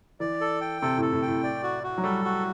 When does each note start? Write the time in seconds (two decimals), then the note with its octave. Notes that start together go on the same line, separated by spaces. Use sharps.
0.20 E3 D5
0.41 A4
0.61 G5
0.82 C3 A4
0.97 A2
1.02 A4
1.12 A2
1.22 G5
1.28 A2
1.43 D5
1.63 F#4
1.83 F#4
1.98 F#3
2.04 G3 A4
2.25 F#4